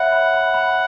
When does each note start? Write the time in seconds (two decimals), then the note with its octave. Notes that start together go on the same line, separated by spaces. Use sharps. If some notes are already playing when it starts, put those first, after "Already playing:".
Already playing: C#5 E5 F#5 B5
0.12 B5
0.34 B5
0.54 B5